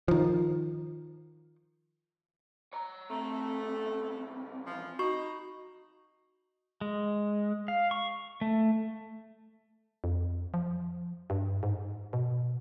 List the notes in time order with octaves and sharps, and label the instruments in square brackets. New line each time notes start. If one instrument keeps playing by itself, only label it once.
[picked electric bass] D#3 F3
[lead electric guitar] C#5 A#5
[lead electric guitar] B1 C4 [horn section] A3
[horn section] E3 F3
[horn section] D#4 [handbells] F#4 C#6
[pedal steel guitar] G#3
F5
C#6
A3
[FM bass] F2
F3
G2
G#2
B2